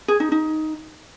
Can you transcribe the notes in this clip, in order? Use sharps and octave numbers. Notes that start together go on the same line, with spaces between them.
G#4
D#4
D#4